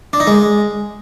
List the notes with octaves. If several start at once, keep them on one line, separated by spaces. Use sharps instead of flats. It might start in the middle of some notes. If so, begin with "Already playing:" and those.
D4
D#4
G#3